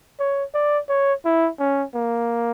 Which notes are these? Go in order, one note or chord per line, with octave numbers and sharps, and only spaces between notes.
C#5
D5
C#5
E4
C#4
A#3